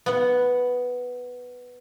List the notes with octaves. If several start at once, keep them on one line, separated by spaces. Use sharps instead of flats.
B3 F#5